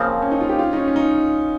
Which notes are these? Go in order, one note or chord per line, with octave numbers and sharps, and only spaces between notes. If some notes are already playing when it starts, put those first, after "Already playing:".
Already playing: C#3 F3 A#3 C4
C#4
D#4
F4
G4
F4
D#4
C#4
C#4
D#4